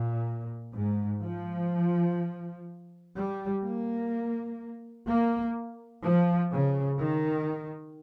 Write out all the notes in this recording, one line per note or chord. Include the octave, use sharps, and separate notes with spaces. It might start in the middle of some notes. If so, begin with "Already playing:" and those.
Already playing: A#2
G#2
F3
G3
A#3
A#3
F3
C#3
D#3